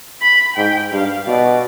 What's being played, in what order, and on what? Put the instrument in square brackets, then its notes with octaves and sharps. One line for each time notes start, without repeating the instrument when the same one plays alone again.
[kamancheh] B5
[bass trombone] G#2 [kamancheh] G5
[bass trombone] G2 [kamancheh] F5
[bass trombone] B2 [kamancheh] D5